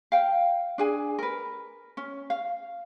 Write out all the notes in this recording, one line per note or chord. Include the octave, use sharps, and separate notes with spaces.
F5 G5
D4 G#4 G#5
A#4 B4
C#4
F5